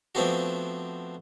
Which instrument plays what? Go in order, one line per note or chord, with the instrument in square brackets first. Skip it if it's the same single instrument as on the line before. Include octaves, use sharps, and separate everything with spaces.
[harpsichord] F3 A3 B3 C4 D4 F#4